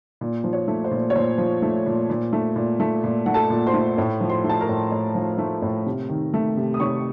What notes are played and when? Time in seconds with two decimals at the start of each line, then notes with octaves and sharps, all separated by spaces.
0.21 A#2
0.44 F3
0.53 C#5
0.68 A3
0.84 C5
0.91 A#2
1.10 C#5
1.15 A#2 C5
1.38 F3
1.62 A3
1.86 A#2
2.10 A#2
2.33 A3
2.56 A#2
2.80 A3
3.04 A#2
3.26 A3 F#5
3.34 A4 A5
3.50 A#2
3.67 C5 C6
3.74 A3
3.98 A2
4.21 F3
4.30 C5 C6
4.44 A3
4.49 A5
4.61 A#4 A#5
4.69 A2
4.92 A2
5.15 F3
5.38 A3
5.62 A2
5.86 C3
6.09 D#3
6.34 A3
6.57 C3
6.74 D#6
6.80 C3 C#5 C#6